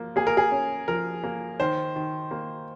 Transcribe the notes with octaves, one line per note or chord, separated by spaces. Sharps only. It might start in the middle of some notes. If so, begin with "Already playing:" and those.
Already playing: F3 A#3
A#3 G#4
A#4
G#4
C#4
F3 A#4
A#3
D#3 C5
D#3
A#3